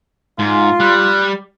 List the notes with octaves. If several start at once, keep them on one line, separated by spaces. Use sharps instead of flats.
G#2 F4
G3 F#6